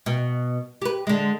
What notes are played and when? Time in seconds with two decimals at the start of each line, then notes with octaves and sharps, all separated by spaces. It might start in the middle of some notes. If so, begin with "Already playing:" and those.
0.06 B2
0.82 G4 B4
1.07 D3 G#3